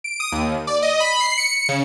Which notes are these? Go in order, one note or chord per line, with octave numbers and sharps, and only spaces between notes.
D7
D#6
D#2
D5
D#5
B5
C7
C#7
C#3